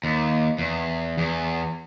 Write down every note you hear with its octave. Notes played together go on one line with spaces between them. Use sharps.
D#2
E2
E2